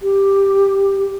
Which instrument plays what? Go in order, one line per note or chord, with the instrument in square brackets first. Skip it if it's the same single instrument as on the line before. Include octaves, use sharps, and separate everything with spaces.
[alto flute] G4